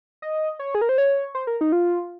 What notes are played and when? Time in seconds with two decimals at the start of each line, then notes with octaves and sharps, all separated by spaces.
0.22 D#5
0.59 C#5
0.75 G#4
0.81 A#4
0.89 C5
0.98 C#5
1.35 C5
1.47 A#4
1.61 D#4
1.72 F4